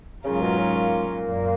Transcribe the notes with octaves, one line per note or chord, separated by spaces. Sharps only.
G#2 C#3 F#3 C#4 F4 A#4
B2
C#3
A#2 A#3
F#2